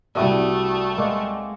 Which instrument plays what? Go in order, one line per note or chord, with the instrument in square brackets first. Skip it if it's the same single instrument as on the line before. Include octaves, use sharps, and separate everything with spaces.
[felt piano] C2 E5 E6 [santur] G3 D#6 [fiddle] A3 [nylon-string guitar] E4 F#4
[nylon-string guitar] G#3 [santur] A#3 F#5